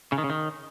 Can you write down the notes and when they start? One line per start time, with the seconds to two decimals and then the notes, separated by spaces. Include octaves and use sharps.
0.12 C#3
0.18 D#3
0.24 C#3
0.30 D#3